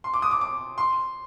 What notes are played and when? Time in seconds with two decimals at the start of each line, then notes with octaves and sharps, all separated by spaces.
0.04 C6
0.14 D6
0.22 D#6
0.31 D6
0.41 D6
0.78 C6